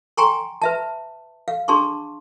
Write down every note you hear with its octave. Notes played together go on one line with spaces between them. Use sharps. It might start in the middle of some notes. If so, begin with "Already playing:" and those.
G5 G#5 A#5 C6 C#6
B4 E5 A5
F5
D4 G#4 A5 C6 C#6